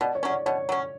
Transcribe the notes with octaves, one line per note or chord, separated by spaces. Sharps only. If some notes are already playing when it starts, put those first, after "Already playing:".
B2 D5
C#5
F#3 C#4
D5
B2 C#5
F#3 C#4